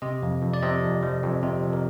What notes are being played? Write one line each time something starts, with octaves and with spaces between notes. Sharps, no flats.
C3 D#5
F2
F2
D5
C3 D#5
F2
F3
F2
C3
F2
A#4